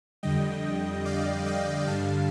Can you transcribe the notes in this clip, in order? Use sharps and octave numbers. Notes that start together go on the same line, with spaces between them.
F2 D3 G3 D#5 G5
D5 F5
D#5 G5
G2 D3 G3 F5 A5